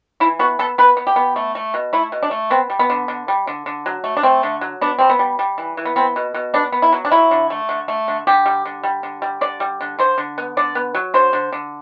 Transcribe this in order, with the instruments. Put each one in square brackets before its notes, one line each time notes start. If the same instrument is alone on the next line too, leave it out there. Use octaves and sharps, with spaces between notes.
[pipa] E3 E4
B3 F#4
B3 A4
B3 B4
B3
G4
B3
A3
A3
B2
A3 E4
B2
D4
A3
B3 C4
G3
B3
D3
D3
G3
D3
D3
F#3
A3
D4
A3 C4
D3
F#3
B3 D4
G3 C4
B3
G3
G3
E3
E3
B3
B3 C4
B2
B2
B3 D4
B3
E4
F#3
D4
F#3 E4
D3
A3
D3
A3
D3
D3 G4
G3
D3
G3
D3
G3
D3 D5
G3
D3
D3 C5
D3
B3
D3 D5
B3
F#3
D3 C5
D3
D3